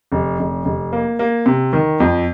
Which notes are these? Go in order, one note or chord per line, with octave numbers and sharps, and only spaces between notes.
F1
F1
F1
A#3
A#3
C3
D#3
F2